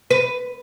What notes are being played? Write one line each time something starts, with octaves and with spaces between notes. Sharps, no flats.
B4